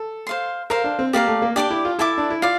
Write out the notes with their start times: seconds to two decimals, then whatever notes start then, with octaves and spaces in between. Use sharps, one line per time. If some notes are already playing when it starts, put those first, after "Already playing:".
Already playing: A4
0.27 C5 F5 C6
0.70 A4 A#4 C5 F5
0.84 D4
0.99 C4
1.13 A#3 G4 D5 F5 A#5
1.27 A3
1.42 A#3
1.56 D4 G4 D5 A5 D6
1.71 E4
1.85 F4
1.99 E4 A4 E5 A5 D6
2.18 D4
2.30 E4
2.42 F4 D5 F5